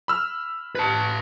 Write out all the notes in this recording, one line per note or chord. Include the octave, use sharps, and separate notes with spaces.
B5 E6 F6
B4 A5